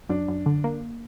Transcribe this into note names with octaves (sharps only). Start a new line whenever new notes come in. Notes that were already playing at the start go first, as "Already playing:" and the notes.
F#2 D4
F#2
D3
A#3